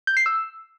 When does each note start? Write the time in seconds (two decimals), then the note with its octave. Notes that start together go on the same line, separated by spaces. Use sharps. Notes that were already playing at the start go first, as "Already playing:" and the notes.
0.07 G6
0.17 C7
0.26 E6